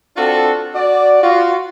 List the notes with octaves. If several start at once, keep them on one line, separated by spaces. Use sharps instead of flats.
C4 D4 F4 F#4 A4
F#4 D5
F4 F#4